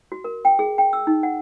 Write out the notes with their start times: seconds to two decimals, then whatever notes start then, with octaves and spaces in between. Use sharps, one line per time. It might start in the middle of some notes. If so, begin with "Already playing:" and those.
0.12 F#4
0.24 A#4
0.45 G5
0.59 G#4
0.78 G5
0.93 E6
1.07 D#4
1.23 F#5